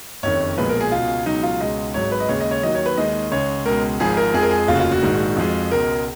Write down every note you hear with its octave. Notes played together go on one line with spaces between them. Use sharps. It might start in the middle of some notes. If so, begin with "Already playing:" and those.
F#1 F2 D#3 C#5
B1 A#2 F3 G#3 B4
A#4
G#4
C#2 B2 G#3 F4
C#2 B2 F#3 D#4
F4
C#2 B2 G#3 D#5
G#1 G#2 F#3 C#5
B4
D#5
D#2 C#3 G#3 C#5
D#5
C#5
D#2 D#3 F#3 D#5
C#5
B4
D#2 D#3 G#3 D#5
C#2 C#3 G#3 C#5
C#2 B2 G#3 A#4
G#1 G#2 F3 G#3 G#4
A#4
F2 F3 G#3 G#4
A#4
G#4
F1 D#2 C#3 F4
F#4
F4
F#4
A#1 G#2 D#3
F2 F3 G#3
C#2 B2 G#3 A#4